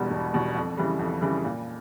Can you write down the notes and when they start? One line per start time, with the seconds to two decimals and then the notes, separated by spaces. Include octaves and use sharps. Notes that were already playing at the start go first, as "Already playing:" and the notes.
Already playing: E1 E2 B2 G3
0.10 E1
0.33 E2 B2 G3
0.55 F2
0.77 C#3 E3 G3
0.99 F2
1.21 C#3 E3 G3
1.45 A#2